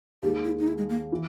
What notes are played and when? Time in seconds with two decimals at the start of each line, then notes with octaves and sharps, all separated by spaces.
0.23 D#2 D#3 G#3 G4
0.45 E4
0.60 D#4
0.67 E4
0.78 G#3
0.89 A#3
1.12 E3